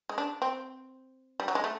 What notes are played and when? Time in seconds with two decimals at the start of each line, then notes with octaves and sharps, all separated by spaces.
0.09 G#3
0.18 D4
0.42 C4
1.40 G3
1.48 F#3
1.55 G#3
1.64 A3